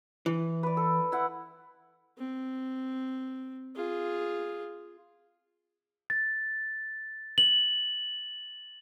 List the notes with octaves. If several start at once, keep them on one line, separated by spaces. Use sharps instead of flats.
E3
B4 D5
A4
E4 F#5
C4
F4 G#4
A6
F#7